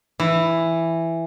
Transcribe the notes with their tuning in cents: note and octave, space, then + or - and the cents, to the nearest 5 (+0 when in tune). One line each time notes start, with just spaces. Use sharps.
E3 +5